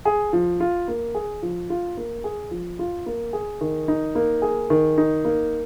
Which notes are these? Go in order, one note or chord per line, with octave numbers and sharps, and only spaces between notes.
G#4
F3
F4
A#3
G#4
F3
F4
A#3
G#4
F3
F4
A#3
G#4
D#3
D#4
A#3
G#4
D#3
D#4
A#3